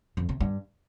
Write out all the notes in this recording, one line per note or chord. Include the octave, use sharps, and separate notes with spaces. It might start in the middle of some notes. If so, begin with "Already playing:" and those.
F2
C3
G2